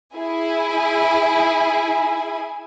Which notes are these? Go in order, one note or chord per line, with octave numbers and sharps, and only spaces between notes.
E4 G#4 G#5